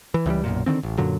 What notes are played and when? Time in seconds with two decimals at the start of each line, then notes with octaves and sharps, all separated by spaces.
0.14 E3
0.26 C#2 E3 F3 G3
0.44 B1 F#2 A#2
0.66 D3 D#3 F3 C4
0.83 A1
0.98 F#2 A#2 D3 F#3